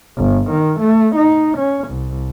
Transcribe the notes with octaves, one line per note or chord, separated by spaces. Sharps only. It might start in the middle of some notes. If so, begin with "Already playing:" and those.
G1
D#3
A3
D#4
C#4
C2